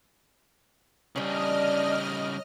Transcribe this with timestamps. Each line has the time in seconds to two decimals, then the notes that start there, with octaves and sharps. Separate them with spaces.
1.16 C#3 G3 C#4 D4 D#5 F6